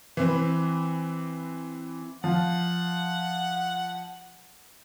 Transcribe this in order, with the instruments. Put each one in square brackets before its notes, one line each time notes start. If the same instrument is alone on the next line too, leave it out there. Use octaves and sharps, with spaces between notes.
[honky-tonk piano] E3 C4 B4
[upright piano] F3 [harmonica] F#5